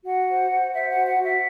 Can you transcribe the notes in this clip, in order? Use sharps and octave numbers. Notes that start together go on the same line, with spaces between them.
F#4 F#5
C5
C5
C5 E5
F#5
F#4
F#5
F#4
E5